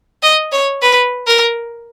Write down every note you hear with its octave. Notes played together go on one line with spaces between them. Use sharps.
D#5
C#5
B4
A#4